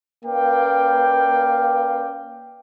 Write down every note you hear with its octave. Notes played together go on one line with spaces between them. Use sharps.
A#3 C#4 B4 D5 F5 G5